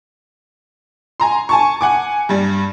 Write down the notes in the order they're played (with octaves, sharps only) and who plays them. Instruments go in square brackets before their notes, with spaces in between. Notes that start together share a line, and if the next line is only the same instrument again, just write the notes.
[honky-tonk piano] G#5 A#5 C6
G#5 A5 C#6
F#5 G#5 D6
G2 G3